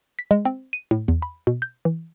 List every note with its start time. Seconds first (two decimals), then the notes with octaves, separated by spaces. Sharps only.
0.19 B6
0.31 G#3
0.45 C4
0.73 D#7
0.91 A2
1.08 E2
1.22 B5
1.47 B2
1.62 G6
1.85 E3